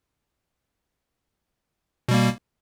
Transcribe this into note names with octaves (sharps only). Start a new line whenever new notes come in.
B2 G3 A#3